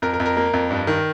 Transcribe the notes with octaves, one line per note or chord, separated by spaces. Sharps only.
F2 A#4
A#4
F2
A#4
A#3
F2
G2
D#3